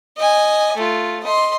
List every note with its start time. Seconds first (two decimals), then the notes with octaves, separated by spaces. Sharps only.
0.17 D#5 G#5
0.76 A3 F4
1.24 D#5 C6